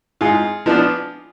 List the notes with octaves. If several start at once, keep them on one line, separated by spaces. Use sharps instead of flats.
G#2 F4 G#4
F3 B3 D4